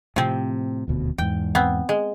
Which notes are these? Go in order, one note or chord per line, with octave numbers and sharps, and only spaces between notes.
A2 C3 F3 C4
D#1 D2 B2
E2 G#2 G5
B3 C4
G#3